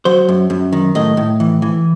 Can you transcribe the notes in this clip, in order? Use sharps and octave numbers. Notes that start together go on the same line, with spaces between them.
F#3 C5
F#2
F#2
D#3
A2 D#5
A2
E3
E3